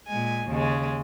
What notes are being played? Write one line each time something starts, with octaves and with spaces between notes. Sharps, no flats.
A#2 G#3 G#5
D#2 C#3 G#3